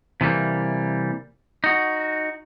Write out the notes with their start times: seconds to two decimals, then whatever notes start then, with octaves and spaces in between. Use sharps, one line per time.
0.21 C3 E3 G3 A#3
1.64 D#4 F#4